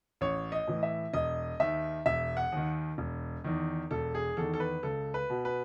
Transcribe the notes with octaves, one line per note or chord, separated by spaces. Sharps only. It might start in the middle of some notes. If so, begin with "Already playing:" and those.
A1 C#5
D#5
A2 E3
E5
E1 D#5
D#2 D#3 E5
E1 E5
F#5
D#2 D#3
E1
E2 D#3
E1 A4
G#4
E2 D#3 A4
A4
B4
C#2 A4
B4
B2
B4